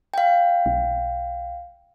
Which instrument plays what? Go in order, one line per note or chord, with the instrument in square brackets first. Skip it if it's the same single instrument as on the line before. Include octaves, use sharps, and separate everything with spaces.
[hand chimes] F5 G5
[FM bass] B1